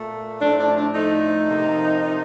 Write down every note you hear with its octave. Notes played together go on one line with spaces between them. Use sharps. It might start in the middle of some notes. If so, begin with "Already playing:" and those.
Already playing: A#2 A3
A2 F3 A3 D4
D4
D4
A2 F3 A3 D#4
C3 F3 A#3
C3 F3 A#3